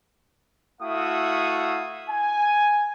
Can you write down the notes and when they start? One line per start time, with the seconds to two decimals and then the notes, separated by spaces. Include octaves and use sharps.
0.82 A3 E4 F#4 F5 D#6
2.09 G#5